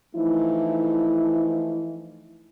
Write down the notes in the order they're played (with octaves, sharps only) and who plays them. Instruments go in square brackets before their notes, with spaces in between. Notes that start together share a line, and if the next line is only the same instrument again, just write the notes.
[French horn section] E3 F3 A3 D#4 E4